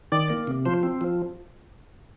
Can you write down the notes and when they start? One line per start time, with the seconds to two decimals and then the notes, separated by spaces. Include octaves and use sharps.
0.12 D#3 D5
0.30 A#3
0.47 C3
0.65 F3 C5
0.83 C4
1.01 F3